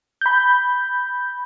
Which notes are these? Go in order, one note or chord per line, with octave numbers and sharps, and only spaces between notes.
B5 G6